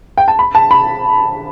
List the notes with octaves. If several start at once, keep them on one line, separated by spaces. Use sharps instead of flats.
G5
A5
B5
A5
B5